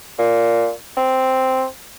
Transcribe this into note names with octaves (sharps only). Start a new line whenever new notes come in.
A#2
C4